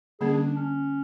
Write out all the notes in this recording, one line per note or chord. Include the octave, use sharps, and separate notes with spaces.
D3 G3 A#3 C#4 G#4
D4
D4
C#4